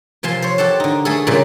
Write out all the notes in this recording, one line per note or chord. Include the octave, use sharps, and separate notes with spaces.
C3 F3 G#5 A5 C6
C5 C#5
G4 A4 F#5 A5
D3 D#4
A3 G#4 A4
A#2 C#3 G3 A3